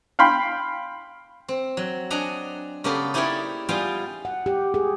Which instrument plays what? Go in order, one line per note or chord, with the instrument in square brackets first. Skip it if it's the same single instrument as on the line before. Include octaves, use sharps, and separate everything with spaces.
[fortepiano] F5 G5 B5 C6
[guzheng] C4
F#3
D4 D#5 F#5 G#5 A#5
C#3 A#3 B3 G4 A4 A#4
D#4 E4 G4 A#4 C#5 D5
G3 B3 F4 G#4 F5 G5
[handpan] F#5
G4
G#4